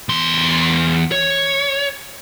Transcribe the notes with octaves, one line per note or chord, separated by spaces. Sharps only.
E2 C6
C#5